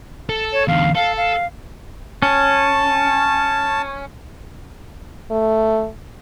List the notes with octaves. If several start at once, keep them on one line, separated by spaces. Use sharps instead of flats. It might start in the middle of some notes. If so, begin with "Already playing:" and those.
A4
C#5
E2 D3 F5
A4 F5
F5
C#4 A5
A3